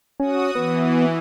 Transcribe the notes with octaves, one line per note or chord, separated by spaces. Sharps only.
C#4 F#4 D#6
E3 B3